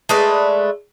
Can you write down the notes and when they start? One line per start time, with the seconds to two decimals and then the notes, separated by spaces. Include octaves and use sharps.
0.09 G#3 A3 B4 D5